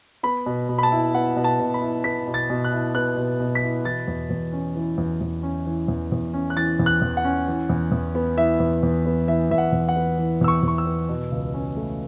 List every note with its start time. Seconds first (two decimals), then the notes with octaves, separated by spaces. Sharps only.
0.23 B3 B5
0.46 B2
0.69 B2
0.78 B5
0.83 A5
0.92 E4
1.14 B3 F#5
1.36 B2
1.44 A5
1.60 B2
1.74 B5
1.82 E4
2.04 B3 B6
2.27 B2
2.34 A6
2.50 B2
2.64 F#6
2.72 E4
2.95 B3 F#6
3.17 B2
3.40 B2
3.55 B6
3.63 E4
3.85 E3 A6
4.08 E2
4.30 E2
4.53 C#4
4.76 E3
4.98 E2
5.21 E2
5.43 C#4
5.66 E3
5.88 E2
6.12 E2
6.34 C#4
6.50 F#6
6.56 E3 A6
6.79 E2
6.86 F#6
7.02 E2
7.17 F#5
7.24 C#4
7.47 E3
7.70 E2
7.92 E2
8.15 B3
8.37 E3 E5
8.60 E2
8.83 E2
9.06 B3
9.28 E3 E5
9.51 E2 E5
9.58 F#5
9.72 E2
9.89 F#5
9.96 B3
10.18 E3
10.41 E2 E6
10.48 C#6
10.63 E2 C#6
10.78 E6
10.86 B3
11.09 B2
11.31 C#2
11.54 C#4
11.76 A3